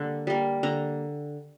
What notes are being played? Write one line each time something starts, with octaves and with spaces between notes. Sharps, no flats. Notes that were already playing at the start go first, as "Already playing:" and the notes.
Already playing: D3 G3 A#3
G3 A#3
D3 A#5